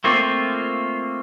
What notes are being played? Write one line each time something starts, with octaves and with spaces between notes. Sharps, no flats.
A3 A#3 C4 F4